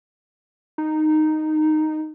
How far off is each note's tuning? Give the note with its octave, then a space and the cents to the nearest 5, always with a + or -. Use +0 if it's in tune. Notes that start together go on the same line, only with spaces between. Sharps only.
D#4 -10